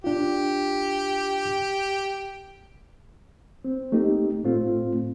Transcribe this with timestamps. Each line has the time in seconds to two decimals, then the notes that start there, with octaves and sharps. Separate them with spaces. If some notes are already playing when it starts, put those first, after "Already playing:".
0.04 D4 F4 G4
3.65 C4
3.92 A3 A#3 D#4 G4
4.44 A2 A3 C4 F4